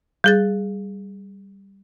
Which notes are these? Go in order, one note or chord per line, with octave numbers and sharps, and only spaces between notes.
G3 G#4 A6